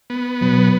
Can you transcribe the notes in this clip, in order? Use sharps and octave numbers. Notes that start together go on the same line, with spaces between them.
B3
B2 F#3
F#3